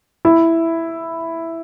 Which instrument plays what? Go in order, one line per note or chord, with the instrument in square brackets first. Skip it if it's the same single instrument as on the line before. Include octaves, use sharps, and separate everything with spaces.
[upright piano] E4